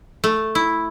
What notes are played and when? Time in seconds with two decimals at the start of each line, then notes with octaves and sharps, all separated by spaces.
0.24 A3
0.55 E4